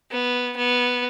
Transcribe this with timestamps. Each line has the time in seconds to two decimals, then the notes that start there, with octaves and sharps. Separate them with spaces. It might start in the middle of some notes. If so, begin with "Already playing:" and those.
0.11 B3
0.57 B3